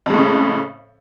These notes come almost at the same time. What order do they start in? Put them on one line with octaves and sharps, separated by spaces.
F2 G#3 A2 C#3